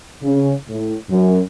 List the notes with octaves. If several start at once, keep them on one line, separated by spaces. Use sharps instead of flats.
C#3
A2
F#2